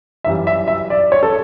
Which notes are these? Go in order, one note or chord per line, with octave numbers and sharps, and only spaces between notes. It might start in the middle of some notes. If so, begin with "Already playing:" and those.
F#2 E3 G3 E5
E5
E5
D5
C#5
A4